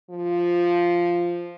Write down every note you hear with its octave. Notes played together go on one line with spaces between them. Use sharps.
F3